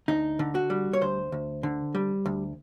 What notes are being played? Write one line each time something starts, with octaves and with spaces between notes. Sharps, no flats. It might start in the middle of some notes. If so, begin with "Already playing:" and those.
D2 D#4
D3
F#4
G3
C#5
D2 C5
D2
D3
G3
D2